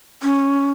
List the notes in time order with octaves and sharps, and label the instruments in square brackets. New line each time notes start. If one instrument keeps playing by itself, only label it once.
[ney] C#4